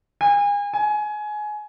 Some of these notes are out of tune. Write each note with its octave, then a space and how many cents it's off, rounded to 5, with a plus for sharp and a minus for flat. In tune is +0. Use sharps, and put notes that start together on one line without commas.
G#5 -35
G#5 +20